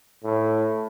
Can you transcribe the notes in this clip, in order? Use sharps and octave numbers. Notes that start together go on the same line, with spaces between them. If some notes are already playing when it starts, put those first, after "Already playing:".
A2